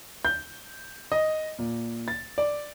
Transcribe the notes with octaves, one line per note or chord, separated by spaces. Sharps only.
G6
D#5
A#2
A6
D5